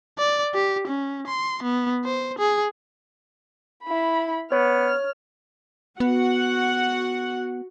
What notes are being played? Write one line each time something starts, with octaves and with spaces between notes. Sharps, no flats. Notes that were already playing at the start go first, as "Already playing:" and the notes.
D5
G4
C#4
C6
B3
C5
G#4
E4 B5
B3 C#5 F6
B3 F#4 F#5